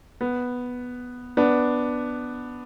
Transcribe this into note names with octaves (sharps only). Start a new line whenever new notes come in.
B3
B3 D4